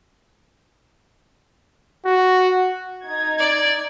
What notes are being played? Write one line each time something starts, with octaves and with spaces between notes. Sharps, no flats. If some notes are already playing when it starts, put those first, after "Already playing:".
F#4
D#4 G#6
D5